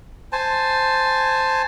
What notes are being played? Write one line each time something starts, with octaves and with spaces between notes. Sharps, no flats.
C5 G#5 A5